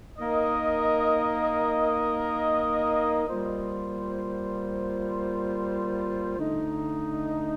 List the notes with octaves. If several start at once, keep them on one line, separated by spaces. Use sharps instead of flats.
A#3 D#4 A#4 D#5
G3 A#3 F4 C5
D3 A3 D#4